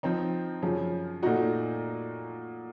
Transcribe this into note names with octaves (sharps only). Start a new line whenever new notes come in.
F3 C4 D#4
F#2 C#3 F3
A#2 A3 D#4 F#4